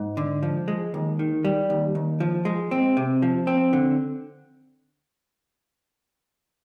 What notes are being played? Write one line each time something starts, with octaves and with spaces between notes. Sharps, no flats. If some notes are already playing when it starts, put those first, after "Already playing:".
Already playing: G#2
D3
F3
G#3
D#2
D#3
G3
D#2
D#2
F3
G#3
C4
C3
F3
C4
D3